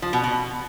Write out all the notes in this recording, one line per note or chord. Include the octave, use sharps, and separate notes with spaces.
F3
B2
B2